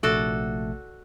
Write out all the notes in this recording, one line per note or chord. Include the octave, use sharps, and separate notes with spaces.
A#1 C3 A3 F#4 A4 D5